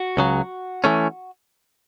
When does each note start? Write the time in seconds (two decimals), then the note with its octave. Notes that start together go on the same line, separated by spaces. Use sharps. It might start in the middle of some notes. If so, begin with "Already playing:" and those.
Already playing: F#4
0.17 C#2 C#3 F#3
0.84 E3 A3 C#4